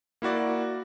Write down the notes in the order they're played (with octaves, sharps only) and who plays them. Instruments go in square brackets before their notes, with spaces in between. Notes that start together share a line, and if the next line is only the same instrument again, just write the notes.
[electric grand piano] A#3 E4 F#4 D5